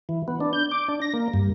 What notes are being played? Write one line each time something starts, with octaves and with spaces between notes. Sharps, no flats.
E3
B3
D4
G6
D6
D4
A#6
A#3
G2